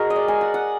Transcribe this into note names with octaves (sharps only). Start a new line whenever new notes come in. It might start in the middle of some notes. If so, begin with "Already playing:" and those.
Already playing: G#3 F#4 G#4 A#4
D#5
D5
G#5
F#5
F#5